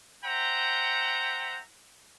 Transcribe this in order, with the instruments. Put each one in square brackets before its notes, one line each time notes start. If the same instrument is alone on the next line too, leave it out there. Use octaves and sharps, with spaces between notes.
[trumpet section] C5 E5 F#5 G5 A#5